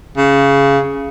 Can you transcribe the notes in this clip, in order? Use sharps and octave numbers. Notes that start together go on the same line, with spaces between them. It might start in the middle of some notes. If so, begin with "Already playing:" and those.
C#3